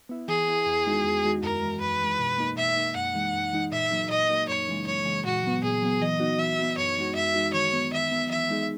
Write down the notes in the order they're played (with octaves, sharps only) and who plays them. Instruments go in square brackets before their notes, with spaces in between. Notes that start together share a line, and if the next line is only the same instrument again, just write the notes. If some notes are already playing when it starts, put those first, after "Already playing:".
[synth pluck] B3 E4
[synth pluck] E3 [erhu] G#4
[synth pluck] B3 E4
E2
D#3 G#3 D#4 F#4
E2
D#3 G#3 D#4 F#4
[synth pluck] F#2 [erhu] A#4
[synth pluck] E3 G#3
[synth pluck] F#2 [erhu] B4
[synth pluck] E3 G#3
B2
A#3 D#4
[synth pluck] B2 [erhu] E5
[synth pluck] A#3 D#4
[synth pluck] F#2 [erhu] F#5
[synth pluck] E3 G#3 D#4
F#2
E3 G#3 D#4
[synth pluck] A#2 [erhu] E5
[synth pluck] F#3 A#3 D#4
[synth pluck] A#2 [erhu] D#5
[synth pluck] F#3 A#3 D#4
[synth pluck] F#2 [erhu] C#5
[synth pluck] C#3 E3 G#3
[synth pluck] F#2 [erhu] C#5
[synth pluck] C#3 E3 G#3
[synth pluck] A#2 [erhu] F#4
[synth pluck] F#3 B3
[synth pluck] A#2 [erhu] G#4
[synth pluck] F#3 B3
[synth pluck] E3 [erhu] D#5
[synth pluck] B3 D#4 F#4
[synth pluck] E3 [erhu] E5
[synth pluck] B3 D#4 F#4
[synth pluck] F#2 [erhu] C#5
[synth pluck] E3 G#3 D#4 F#4
[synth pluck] F#2 [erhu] E5
[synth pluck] E3 G#3 D#4 F#4
[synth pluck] D#3 [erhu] C#5
[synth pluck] F#3 B3
[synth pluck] D#3 [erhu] E5
[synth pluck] F#3 B3
[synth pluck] E3 [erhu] E5
[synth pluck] G#3 D#4 G#4